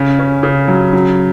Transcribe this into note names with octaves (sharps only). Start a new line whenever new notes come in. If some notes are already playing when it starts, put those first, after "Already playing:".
Already playing: C#3 C#4
C#4
C#3
F#3
F#3